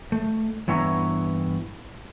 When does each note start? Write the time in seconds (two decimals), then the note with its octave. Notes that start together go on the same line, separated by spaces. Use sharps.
0.12 A3
0.68 G2 E3 B3 E4 C#5 A#5